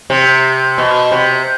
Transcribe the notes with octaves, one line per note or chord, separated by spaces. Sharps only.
C3
B2
C3